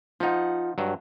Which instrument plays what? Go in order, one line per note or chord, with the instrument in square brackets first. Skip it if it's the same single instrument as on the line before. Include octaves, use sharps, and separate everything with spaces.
[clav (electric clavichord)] F3 D#4 [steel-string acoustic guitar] F4 F#5
[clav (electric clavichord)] G2 F#3